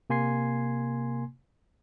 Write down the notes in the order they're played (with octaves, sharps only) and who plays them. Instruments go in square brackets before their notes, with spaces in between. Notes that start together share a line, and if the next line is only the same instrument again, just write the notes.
[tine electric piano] C3 A#3 G#5 C6 G#6 C7